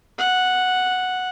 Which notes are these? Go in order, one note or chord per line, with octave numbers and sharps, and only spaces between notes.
F#5